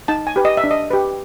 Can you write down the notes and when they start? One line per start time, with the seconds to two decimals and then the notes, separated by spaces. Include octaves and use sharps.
0.08 D#4 A5
0.27 G#5
0.36 G4 B4
0.45 D#5
0.57 E5
0.64 D4
0.71 D#5
0.91 G4 B4